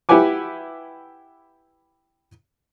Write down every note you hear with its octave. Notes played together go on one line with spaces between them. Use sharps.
E4 G4 B4 F#5 G#5 D6